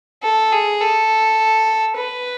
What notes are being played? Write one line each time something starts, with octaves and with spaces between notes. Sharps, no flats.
A4
G#4
A4
B4